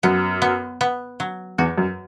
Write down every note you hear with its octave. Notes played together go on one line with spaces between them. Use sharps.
F#2 B3
B3
B3
F#3
E2 F#4
F#2